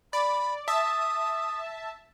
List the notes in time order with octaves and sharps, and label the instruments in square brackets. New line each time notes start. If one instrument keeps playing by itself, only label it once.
[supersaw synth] D5 [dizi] B5
[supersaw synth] E5 A5 [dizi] D#6